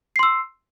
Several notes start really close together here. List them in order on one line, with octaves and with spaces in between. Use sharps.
C7 C6 E6